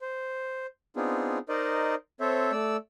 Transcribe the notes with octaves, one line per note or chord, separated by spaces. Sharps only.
C5
B3 C4 D4 D#4 F4 G#4
D#4 A#4 C5 D5 D#5
C4 A4 C5 C#5 E5
A3 D5 E6